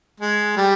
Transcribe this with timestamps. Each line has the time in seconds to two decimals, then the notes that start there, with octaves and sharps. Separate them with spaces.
0.20 G#3
0.57 G3